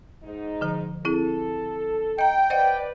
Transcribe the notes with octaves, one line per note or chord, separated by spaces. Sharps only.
G#2 D#4
D3 F3 A#5
C4 E4 G#4 A4
D#5 G5 A#5
B4 C5 D5 D#5 F#5